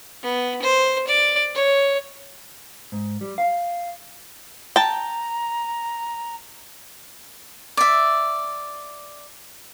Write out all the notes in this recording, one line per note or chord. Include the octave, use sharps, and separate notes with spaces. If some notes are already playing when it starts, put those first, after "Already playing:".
B3
C5
D5
C#5
G#2
G3
F5
G5 A5 A#5
D5 E5